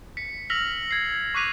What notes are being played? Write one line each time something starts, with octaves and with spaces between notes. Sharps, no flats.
B6 C#7
E6 F6 A#6 B6 F7 F#7
G#6 C7
C#6 D6 F#6 B6 D#7 F7